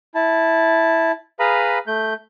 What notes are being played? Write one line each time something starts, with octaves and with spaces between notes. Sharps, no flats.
E4 A5
G#4 B4 F5 A#5 B5 D#6
A3 G6